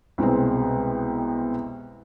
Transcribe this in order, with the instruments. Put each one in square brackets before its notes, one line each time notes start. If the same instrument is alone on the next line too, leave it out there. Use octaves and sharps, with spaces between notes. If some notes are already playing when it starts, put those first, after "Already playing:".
[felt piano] C2 B2 G#3 C4